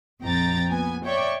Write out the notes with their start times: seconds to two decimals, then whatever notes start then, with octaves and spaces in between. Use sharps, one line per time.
0.22 A#1 F2 G5 A#5 A6
0.70 A#2 B3 G#5
1.05 C#5 D5 E5 G5 C#6